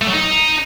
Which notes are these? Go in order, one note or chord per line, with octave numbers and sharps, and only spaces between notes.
A3
F#3
D#4